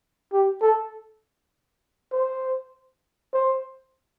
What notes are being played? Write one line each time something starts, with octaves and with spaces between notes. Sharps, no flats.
G4
A4
C5
C5